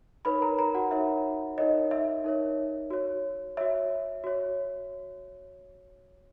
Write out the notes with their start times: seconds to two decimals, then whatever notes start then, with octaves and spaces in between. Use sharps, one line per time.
0.25 D#4 A#4 B4 C#5 B5
0.42 A#4 A#5
0.59 A#4 A#5
0.75 F#4 F#5
0.91 D#4 A#4 C#5 E5
1.58 D#4 A#4 C#5 D#5
1.91 E5
2.24 D#4 A#4 C#5
2.90 F#4 C#5
3.57 F#4 C#5 E5
4.24 F#4 C#5